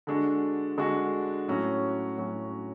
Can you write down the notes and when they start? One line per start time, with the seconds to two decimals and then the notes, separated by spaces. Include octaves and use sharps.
0.07 D3 G#3 D4 F#4
0.77 D3 G#3 D4 F#4
1.48 A2 F#3 C#4 F#4
2.18 A2 F#3 C#4 F#4